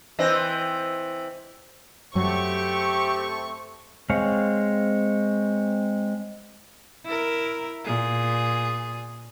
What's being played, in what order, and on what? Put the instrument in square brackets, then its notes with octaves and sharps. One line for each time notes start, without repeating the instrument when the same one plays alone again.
[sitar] E3 C4 D#5
[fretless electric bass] F#2 F#3 [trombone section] A3 C4 [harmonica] G4 [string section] C#6
[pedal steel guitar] G#3 C4 C#5 F5
[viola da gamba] E4 A#4
A#2 G#4